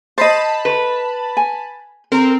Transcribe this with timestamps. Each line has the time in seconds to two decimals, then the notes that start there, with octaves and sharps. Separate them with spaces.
0.18 C5 D#5 A5 B5
0.65 B4
1.37 G#5
2.12 C4 A#4